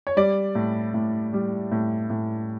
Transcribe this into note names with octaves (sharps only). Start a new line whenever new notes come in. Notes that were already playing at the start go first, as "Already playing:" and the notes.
C#5
G3 D5
A2
A2
G3
A2
A2